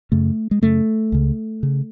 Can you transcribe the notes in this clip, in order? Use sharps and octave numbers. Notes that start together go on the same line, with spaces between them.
F#2 C#3 A3
G#3
F#2 C#3 A3
C#2 C#3
C#3